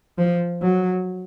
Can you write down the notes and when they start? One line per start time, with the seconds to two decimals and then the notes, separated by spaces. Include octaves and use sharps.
0.18 F3
0.61 F#3